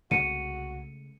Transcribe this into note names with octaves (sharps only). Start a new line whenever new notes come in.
C2 C#3 G#3 A3 F#4 C#7 D#7